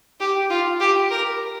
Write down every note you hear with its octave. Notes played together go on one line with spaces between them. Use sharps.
G4
F4
G4
A#4